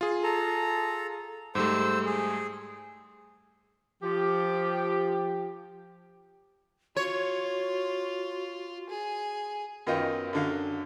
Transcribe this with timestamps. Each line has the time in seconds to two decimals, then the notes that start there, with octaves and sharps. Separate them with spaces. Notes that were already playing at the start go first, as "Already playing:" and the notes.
0.01 F4 G#4
0.23 A4 A#5
1.55 G#2 G3 A3 C5 E6
2.06 G#4
4.03 F3 G4
6.97 F4 F#4 C#5
8.89 G#4
9.87 F#2 D#3 B3 F4 D#5 G5
10.33 F#2 D3 F5